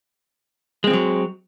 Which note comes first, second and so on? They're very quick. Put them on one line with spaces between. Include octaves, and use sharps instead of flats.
G#3 C4 F3 F#3